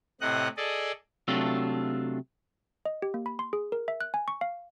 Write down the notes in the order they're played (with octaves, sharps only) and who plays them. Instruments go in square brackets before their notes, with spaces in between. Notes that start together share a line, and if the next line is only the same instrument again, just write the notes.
[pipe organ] A2 C3 D#5 F#5 F#6
G#4 A4 D5 D#5
[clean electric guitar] C3 F#3 A3 D4 F4 A4
[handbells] D#5
G4
A#3
B5
C6
G#4
A#4
E5
F#6
G#5
C#6
F5